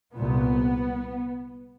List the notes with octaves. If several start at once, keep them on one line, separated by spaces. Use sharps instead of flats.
C2 A#2 B3